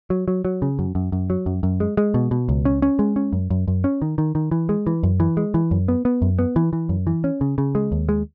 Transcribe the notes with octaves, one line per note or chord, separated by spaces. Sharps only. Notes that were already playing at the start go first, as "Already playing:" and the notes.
F#3
F#3
F#3
C#3
F#2
F#2
F#2
F#3
F#2
F#2
G#3
G#3
B2
B2
C#2
C#4
C#4
G#3
C#4
F#2
F#2
F#2
C#4
D#3
D#3
D#3
E3
G#3
E3
F#2
E3
G#3
E3
F#2
B3
B3
F#2
B3
E3
E3
F#2
E3
C#4
C#3
C#3
G#3
D#2
G#3